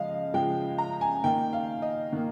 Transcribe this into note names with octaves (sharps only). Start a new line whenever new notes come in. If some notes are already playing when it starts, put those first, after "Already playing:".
Already playing: C#3 F3 G#3 D#5 F5
C#3 F3 G#3 G5
A#5
G#5
D#3 A#3 G5
F5
D#5
D#3 A#3